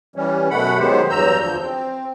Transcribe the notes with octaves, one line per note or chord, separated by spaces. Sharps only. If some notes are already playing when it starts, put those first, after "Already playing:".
E3 G3 C#4
F#2 B2 A3 F#5 B5
D#3 F#3 G#3 B3 G4 C5
E2 G2 F#3 A#5 E6 G6
D2 F3 G6
C4